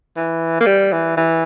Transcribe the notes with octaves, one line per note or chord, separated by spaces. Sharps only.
E3
A#3
G3
E3
E3